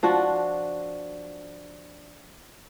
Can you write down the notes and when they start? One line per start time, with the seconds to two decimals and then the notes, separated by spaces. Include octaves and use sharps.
0.03 F3 D4 F#4